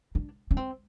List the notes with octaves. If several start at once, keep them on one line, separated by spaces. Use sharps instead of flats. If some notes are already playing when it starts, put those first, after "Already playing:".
D4
C#4
C4